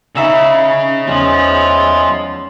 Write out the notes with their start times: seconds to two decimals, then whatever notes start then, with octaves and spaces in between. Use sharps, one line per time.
0.15 C#3 C#4 D#4 E5 B5
1.07 E2 F3 G#3 C#4